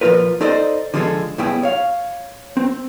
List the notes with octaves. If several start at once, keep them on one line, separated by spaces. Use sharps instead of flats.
A#2 F3 D#4 F4 A#4 B4
D#4 A4 C5 D5 D#5
D3 F3 G#3 C4 G#4 A4
C2 F#2 B2 E4 G#4 G5
C#5 F5
C4